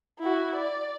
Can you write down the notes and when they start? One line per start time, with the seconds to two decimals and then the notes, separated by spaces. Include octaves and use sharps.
0.20 E4 F#4
0.55 D5